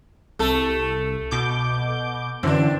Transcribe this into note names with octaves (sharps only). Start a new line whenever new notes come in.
C2 A3 A4
B2 D6 G6
F#2 D3 E3 C4 D4